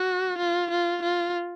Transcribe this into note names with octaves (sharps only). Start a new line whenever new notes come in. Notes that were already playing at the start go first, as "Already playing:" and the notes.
Already playing: F#4
F4
F4
F4